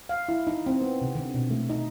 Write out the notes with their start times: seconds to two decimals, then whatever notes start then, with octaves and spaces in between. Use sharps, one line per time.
0.09 F5
0.28 E4
0.47 D#4
0.66 C4
0.82 B3
1.02 C3
1.15 D3
1.34 B2
1.50 A3
1.70 D#4